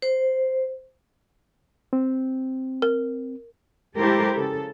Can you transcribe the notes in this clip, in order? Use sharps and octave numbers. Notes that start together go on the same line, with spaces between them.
C5
C4
A#4
G#3 E4 G4 A4 A#4 C5
C#3 A4